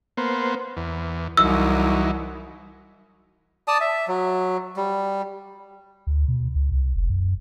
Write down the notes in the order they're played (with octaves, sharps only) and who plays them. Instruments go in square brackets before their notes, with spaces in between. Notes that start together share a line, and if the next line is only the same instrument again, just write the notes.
[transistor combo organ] A#3 B3 C5
E2
[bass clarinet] C2 [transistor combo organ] E3 F#3 D#4 [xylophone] E6
[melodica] D5 A5 D#6
E5
F#3
G3
[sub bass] D2
B2
C#2
C2
F1
F#2